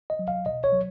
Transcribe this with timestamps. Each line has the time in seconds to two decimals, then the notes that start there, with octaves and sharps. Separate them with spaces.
0.10 D#5
0.19 F#3
0.28 F5
0.46 B2 D#5
0.64 C#5
0.73 F#3